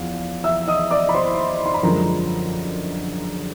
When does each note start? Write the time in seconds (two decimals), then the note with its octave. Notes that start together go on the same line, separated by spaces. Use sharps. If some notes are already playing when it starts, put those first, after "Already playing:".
Already playing: E2 F3 F5
0.44 E5 E6
0.68 D#5 D#6
0.91 D5 D6
1.09 B5
1.14 C5 C6
1.66 C6
1.74 B5
1.83 F#2 D3 F3 G#3 A#4 A#5